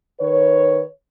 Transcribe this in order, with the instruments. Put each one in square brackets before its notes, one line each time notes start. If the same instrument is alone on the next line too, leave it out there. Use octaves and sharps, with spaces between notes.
[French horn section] D#3 B4 C#5